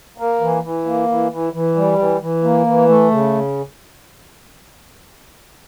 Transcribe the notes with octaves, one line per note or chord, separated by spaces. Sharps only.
A#3
E3
E3
A#3
E3
E3
E3
G3
E3
E3
A#3
E3
A3
C#3